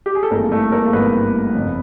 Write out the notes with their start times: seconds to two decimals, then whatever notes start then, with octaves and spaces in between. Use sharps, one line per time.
0.06 G4
0.15 G#4
0.23 A4
0.31 G#1 G2 E3 A3 A#3 A#4
0.52 A3 A4
0.72 A#3 A#4
0.93 G#1 G2 E3 A3 B3 B4
1.55 G1 F2 C#3